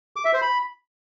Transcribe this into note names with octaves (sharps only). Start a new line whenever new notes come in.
D6
E5
C5
B5